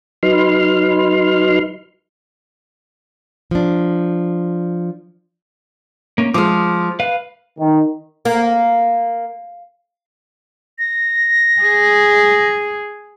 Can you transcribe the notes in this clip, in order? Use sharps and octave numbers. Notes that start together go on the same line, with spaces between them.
F#3 D#4 B4 C6 F6
F3 D4
A#3 C#4
F3 G#3 D6 D#6 F6
B4 F5
D#3
A#3
A#6
G#4